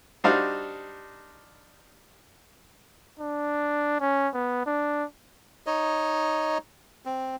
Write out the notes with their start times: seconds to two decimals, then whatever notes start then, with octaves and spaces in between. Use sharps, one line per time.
0.24 G3 D4 D#4 F#4 C5 F5
3.19 D4
4.00 C#4
4.34 B3
4.66 D4
5.67 D#4 C#5 D#5
7.05 C4